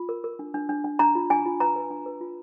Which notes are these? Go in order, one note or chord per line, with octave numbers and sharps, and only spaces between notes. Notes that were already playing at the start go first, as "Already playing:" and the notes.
Already playing: F4
A#4
A#4
D4
D4
D4
D4
D4 A#5
F4
D4 G#5
F4
B4 A#5
B4
D4
B4
F4